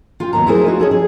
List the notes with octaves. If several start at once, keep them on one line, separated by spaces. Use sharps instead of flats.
F4 F5 G5
D#2 F#3 B3 A#5
A3 E4 F#4 G#4 A#4 C5
F3 D#4 F4 F#4
C#4 G#4 A4
G#4